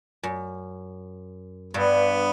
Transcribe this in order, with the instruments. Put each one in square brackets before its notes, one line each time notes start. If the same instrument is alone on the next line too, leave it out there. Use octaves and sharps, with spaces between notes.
[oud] F#2
[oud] G2 [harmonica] B3